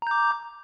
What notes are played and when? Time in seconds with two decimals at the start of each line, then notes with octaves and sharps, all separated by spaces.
0.02 A#5
0.07 G6
0.11 D6